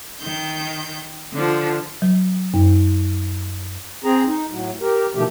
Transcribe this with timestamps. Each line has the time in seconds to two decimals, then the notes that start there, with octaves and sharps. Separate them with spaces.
0.19 D#3 G6
1.33 D3 F3
2.02 F#3
2.54 F#2
4.04 C4 G#4 A#5
4.27 D#4
4.50 A2 F#3
4.81 G4 A#4
5.15 B2 D#3 F3 A3 G4